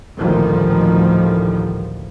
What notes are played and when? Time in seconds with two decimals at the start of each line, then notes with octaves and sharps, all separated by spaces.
0.18 A1 D2 A#2 D#3 F3 G3